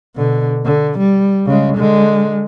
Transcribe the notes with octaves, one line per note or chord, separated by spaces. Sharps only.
B2 D3
D3
G3
C#3 G#3
D3 G#3